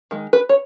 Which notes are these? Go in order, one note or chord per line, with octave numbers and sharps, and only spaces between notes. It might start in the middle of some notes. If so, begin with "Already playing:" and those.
D#3 G#3
B4
C#5